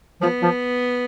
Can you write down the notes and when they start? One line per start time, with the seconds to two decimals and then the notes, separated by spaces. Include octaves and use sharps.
0.21 F3 B3
0.42 F3